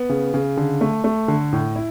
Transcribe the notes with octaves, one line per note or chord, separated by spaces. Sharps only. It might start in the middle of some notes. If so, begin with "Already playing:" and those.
Already playing: B3
C#3
C#3
D3
A3
A3
D3
A2
E4